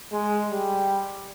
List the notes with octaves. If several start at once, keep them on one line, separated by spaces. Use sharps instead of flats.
G#3
G3